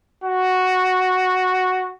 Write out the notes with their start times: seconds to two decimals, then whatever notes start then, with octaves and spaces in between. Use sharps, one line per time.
0.24 F#4